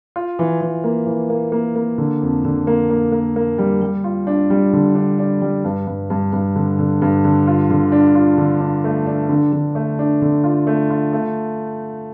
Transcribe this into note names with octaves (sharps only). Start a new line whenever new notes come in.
F4
E3
E3
A#3
E3
A#3
A#3
A#3
D3
F2
D3
A#3
A#3
A#3
A#3
G3
G3
F4
D4
G3
D3
D4
D4
G3
G2
G2
G2
G2
D3
D3
G2
D3
F4
D3
D4
F4
D3
D4
A3
D4
D3
D3
A3
D4
D3
F4
A3
F4
A3